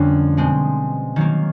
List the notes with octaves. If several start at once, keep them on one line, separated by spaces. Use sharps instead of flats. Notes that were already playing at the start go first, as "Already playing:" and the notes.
Already playing: F2 D3 G3 A#3 C#4
B2 G#3 C4
D#3 F#3 A#3